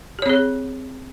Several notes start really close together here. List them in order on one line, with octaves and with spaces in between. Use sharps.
G4 C#5 C4 G#4